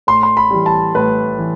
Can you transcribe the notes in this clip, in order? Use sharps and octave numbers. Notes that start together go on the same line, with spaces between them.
A2 C6
C6
B5
E3 G3
A5
A2 B4
E3